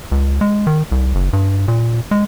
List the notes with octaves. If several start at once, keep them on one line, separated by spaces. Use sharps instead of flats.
C#2
G#3
D#3
C2
F#1
G2
A#2
G#3